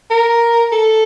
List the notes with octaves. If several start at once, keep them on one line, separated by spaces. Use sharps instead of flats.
A#4
A4